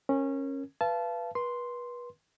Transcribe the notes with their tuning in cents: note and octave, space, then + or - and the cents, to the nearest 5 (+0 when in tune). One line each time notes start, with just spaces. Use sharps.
C#4 -20 A#4 +0
B4 +0 F5 -35 A5 -20
B4 -30 C6 +0